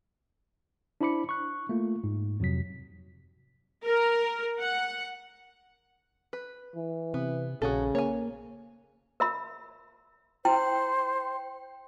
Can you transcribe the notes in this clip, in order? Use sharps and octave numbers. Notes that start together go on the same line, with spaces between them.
D4 E4 C5 B5 D6 C#7
C#6 F#6
A3 A#3 F4
G#2
F2 C3 F#3 B6
A#4
F#5
B4
E3
C3 B3
A#1 C#3 F#4 G#4 A4
A#3 C#5 G#5
A#4 E5 B5
E4 C5 G5